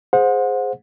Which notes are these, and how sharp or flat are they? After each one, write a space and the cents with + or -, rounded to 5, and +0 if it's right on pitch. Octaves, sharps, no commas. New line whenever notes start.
G#4 +0 C5 +0 F#5 -35